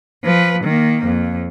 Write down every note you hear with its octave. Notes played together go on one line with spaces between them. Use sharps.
F3 B4
D#3 A#3
F2